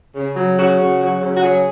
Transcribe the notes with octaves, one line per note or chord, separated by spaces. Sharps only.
C#3
F#3
C#3 F#4
C#3
F#3
C#3
F#4
F#3 G#4